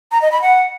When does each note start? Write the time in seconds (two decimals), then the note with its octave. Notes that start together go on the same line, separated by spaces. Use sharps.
0.12 A#5
0.22 D#5
0.32 B5
0.42 F#5